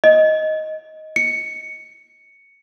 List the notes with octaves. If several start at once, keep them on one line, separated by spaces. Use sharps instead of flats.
D#5
C#7